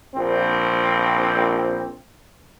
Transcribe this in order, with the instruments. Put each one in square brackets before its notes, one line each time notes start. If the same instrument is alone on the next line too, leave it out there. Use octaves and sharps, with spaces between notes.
[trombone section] A#1 C4